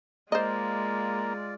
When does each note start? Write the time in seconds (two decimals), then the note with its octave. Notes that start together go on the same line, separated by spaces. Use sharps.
0.32 G#3 A#3 F4 C5 D5 D#5